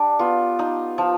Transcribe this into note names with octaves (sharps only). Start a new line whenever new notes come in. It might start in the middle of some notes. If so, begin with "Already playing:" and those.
Already playing: D4 G4
B3 F4
D#4
F3